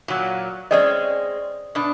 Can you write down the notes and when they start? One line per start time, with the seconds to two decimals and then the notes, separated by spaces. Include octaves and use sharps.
0.08 A#2 F#3
0.71 G#3 C4 C#4 D5 D#5
1.75 B2 D4